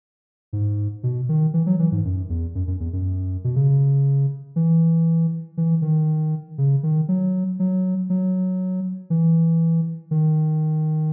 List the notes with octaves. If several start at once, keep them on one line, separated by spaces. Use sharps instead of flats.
G#2
B2
D#3
E3
F#3
E3
G#2
F#2
E2
F#2
F#2
E2
F#2
B2
C#3
E3
E3
D#3
C#3
D#3
F#3
F#3
F#3
E3
D#3